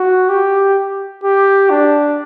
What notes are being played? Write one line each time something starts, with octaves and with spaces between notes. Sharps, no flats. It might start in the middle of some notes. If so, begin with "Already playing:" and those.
Already playing: F#4
G4
G4
D4